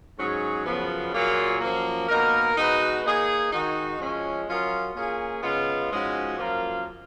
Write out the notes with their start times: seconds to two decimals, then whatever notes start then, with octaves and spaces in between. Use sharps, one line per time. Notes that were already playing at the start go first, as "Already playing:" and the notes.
0.17 G#2 F#3 C#4 G#4
0.65 F#2 C#3 F3 B3
1.13 A#2 F#3 A#3 F4 G#4
1.60 F#2 F3 A#3
2.08 B2 A#3 D#4 A#4
2.56 B2 G#3 D#4 F#4 B4
3.04 A#3 D#4 G#4 C#5
3.52 D#3 G#3 D#4 F#4
3.99 F3 G#3 C#4
4.47 F#3 C#4 F4 A#4 D#5
4.94 A#3 C#4 F4 G#4
5.42 C#3 G#3 B3 F4
5.90 G#2 F3 G#3 C#4 F#4
6.38 F#2 F3 A#3 F4 A#4